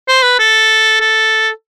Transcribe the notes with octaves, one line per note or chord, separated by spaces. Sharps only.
C5
B4
A4
A4